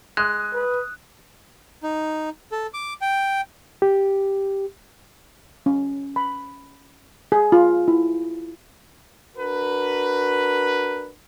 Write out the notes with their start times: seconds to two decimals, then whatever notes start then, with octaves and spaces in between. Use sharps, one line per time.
0.17 G#3 D#6 F#6
0.54 B4
1.83 D#4
2.52 A4
2.74 D6
3.01 G5
3.82 G4
5.66 C#4
6.16 B5
7.32 G#4
7.52 F4
7.88 E4
9.37 D4 F#4 A#4 B4